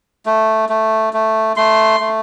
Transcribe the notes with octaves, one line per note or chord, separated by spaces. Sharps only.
A3
A3
A3
A3 C6
A3